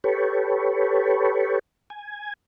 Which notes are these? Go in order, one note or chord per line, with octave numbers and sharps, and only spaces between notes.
G4 A4 B4 C#5
G#5